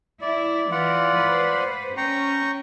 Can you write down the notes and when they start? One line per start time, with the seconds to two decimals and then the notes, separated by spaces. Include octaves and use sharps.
0.21 E4 D5
0.71 E3 F4 D5 F#5
1.18 B4 C5
1.97 C#4 G5 A#5 C#6